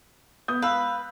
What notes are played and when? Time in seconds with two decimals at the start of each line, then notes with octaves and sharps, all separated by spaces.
0.48 B3 D#6 G6
0.62 B4 F5 E6 F#6